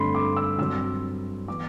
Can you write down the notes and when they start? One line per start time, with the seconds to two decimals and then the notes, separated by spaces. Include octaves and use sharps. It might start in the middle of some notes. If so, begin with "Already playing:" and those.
Already playing: G2 D3 A3 C4 B5 C6
0.15 D6
0.37 E6
0.58 G2 F#3 C4 E6
1.48 E3 B3 D6